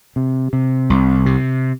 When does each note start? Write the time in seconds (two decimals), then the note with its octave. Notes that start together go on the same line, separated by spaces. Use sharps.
0.16 C3
0.53 C3
0.90 C2
1.26 C3